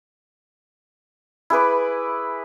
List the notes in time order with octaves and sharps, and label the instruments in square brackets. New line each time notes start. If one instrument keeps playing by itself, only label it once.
[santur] E4 G#4 B4 D6